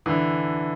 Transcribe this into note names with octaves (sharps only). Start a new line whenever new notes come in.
D3 E3